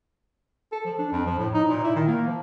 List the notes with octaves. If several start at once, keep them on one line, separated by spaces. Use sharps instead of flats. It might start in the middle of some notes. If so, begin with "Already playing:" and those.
A4
F3
D4
F2
F3
A2
D#4
A#2
E4
D#3
A#3
F3